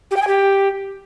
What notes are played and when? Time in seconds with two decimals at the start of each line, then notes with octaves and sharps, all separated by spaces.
0.11 G4
0.16 G5
0.22 G#5
0.27 G4